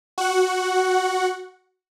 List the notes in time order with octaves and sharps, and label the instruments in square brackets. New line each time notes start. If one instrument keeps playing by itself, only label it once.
[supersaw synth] F#4 F#5